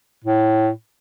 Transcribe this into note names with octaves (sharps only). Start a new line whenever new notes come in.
A2